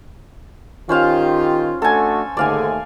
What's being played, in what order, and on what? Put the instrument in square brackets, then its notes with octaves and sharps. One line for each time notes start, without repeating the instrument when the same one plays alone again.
[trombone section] D#3 G4 [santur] C#4 C5 F5 [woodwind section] F4
[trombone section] A3 D4 F#4 [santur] A4 G#5
[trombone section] D#2 A3 [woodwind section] G#2 D3 [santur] D5 F5 G#5